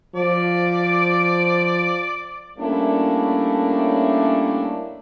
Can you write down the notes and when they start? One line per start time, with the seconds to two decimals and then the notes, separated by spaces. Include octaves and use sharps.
0.15 F3 D5
2.59 G3 A3 A#3 C#4 D4 E4